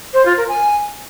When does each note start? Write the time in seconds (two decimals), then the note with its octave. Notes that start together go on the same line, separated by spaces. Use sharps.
0.13 C5
0.25 F4
0.37 A#4
0.48 G#5